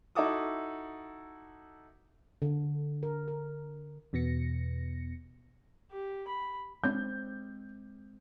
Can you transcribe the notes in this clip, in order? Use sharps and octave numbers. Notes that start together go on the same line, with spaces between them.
D#4 E4 F#4 A4 D6 D#6
D3
A#4
A#4
E2 B2 B3 A#6 C#7
G4
B5
G#3 C4 G6